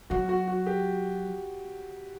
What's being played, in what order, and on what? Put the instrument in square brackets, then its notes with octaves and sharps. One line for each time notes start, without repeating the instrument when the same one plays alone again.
[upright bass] F#3 [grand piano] F#4
[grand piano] F#4
F#4
G4